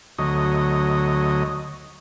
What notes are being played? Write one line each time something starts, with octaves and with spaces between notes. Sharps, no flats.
D2 F#3 D#5